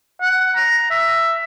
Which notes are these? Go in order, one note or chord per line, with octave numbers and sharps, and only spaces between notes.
F#5
A#5
E5